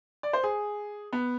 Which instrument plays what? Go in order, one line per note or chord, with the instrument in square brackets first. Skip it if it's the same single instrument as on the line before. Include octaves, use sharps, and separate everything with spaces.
[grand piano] D5
C5
G#4
B3